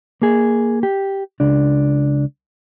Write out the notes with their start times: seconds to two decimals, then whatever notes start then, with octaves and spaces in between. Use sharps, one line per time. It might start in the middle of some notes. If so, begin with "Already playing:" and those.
0.22 A#3 G#4
0.83 G4
1.40 C#2 D4